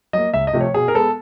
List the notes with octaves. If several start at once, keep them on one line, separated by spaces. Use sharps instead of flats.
F#3 A#3 D#5
C#2 E5
D#5
C3 F3 A3
C#5
B2 G#4
A#4
G#3 B3 A4